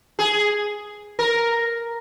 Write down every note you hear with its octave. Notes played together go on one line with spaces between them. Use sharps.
G#4
A#4